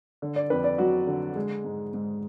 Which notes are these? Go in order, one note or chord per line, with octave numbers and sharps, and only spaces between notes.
D3
D5
F2 B4
D5
F#3 F#4
D3
G#3
G#2
G#2